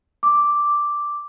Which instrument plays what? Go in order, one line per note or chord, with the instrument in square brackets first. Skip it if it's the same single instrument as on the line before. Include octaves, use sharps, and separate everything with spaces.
[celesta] D6